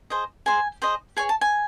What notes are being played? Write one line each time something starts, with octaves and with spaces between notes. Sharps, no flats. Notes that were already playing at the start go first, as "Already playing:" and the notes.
G#4 C5 D#5
G#4 C5 D#5 G#5
G#4 C5 D#5
G#4 C#5 G#5
A5
G#5